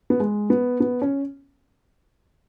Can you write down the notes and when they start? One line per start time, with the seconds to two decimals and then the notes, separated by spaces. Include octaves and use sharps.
0.10 B3
0.20 G#3
0.50 B3
0.80 B3
1.02 C#4